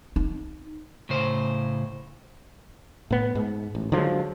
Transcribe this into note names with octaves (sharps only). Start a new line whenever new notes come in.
D#4
A2 C#3 C5
A2 B3
G#2
A1
D3 F3 F#3 G#3